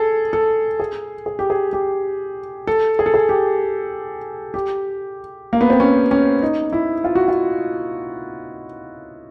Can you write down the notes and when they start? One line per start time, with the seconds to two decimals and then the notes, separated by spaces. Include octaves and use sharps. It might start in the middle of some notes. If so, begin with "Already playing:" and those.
Already playing: G#4 A4
0.33 A4
0.80 G#4
1.26 G#4
1.39 G4
1.50 G#4
1.73 G4
2.67 A4
2.99 G#4
3.06 A4
3.14 G#4
3.29 G4
4.54 G4
5.53 A#3
5.61 B3
5.70 C4
5.80 C#4
6.11 C#4
6.42 D#4
6.73 E4
7.04 F4
7.15 F#4
7.28 F4